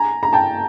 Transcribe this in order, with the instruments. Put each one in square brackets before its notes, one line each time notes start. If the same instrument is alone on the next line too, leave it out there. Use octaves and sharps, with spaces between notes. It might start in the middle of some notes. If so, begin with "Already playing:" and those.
Already playing: [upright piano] G#5 A#5
A#5
G5 A5